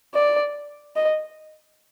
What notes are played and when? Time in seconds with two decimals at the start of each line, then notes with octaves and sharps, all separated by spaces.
0.14 D5
0.96 D#5